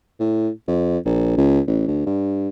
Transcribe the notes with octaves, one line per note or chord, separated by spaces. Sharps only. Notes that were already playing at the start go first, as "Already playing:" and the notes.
A2
F2
A#1
C#2
A1
D2
G2